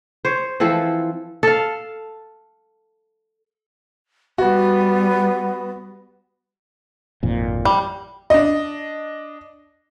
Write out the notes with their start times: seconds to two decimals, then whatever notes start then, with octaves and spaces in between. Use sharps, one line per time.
0.25 C5 C#5
0.60 E3 F3 C4 A4
1.43 A4 F5
4.38 G3 B3 F#4
7.23 G#1 F2 A#2
7.65 G3
8.30 D4 D#5